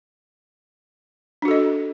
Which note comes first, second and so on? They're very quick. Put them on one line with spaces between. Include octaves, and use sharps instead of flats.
D4 F#4 A4 D#5